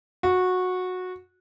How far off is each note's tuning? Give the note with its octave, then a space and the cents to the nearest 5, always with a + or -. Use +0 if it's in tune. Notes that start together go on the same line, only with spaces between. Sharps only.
F#4 -15